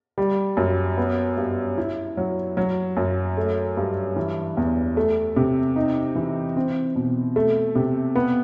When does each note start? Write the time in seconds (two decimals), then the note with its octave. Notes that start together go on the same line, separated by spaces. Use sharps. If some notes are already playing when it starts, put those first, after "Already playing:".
0.18 G3
0.57 F#2
0.98 B3
1.37 G2
1.78 E4
2.17 F#3
2.57 F#3
2.97 F#2
3.37 A3
3.77 G2
4.16 E3
4.57 E2
4.97 A3
5.36 C3
5.76 D#4
6.15 E3
6.56 C4
6.96 B2
7.36 A3
7.75 C3
8.15 B3